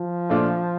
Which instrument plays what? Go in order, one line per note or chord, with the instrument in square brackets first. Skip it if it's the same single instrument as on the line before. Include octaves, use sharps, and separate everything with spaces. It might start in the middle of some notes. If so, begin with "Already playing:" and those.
Already playing: [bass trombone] F3
[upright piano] A#2 A3 D4 F4